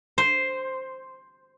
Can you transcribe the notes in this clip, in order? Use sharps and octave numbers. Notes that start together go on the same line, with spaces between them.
C5